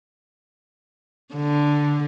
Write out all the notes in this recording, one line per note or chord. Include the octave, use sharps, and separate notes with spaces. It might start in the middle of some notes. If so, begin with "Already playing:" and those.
D3